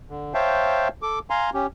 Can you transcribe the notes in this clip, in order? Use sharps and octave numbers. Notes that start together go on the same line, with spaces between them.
D3
C5 C#5 E5 F5 G5 A5
A4 D6
F5 G#5 A#5 C6
C#4 G4